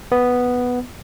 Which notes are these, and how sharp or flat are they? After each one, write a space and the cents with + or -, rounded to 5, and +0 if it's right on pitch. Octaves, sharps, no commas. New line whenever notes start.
B3 +0